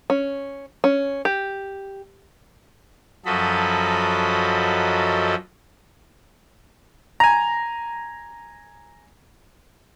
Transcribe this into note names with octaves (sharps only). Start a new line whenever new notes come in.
C#4
C#4
G4
F#2 F3 F#3 A4 D#5 B5
G#5 A#5